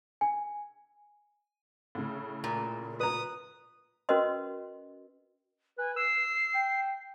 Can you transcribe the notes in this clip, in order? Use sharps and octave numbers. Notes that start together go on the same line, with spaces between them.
G#5
A2 C#3
A#2
B4 A#5 D#6
C#4 F#4 A#4 B4 D#5 C6
B4 G#5
E6 C7
G5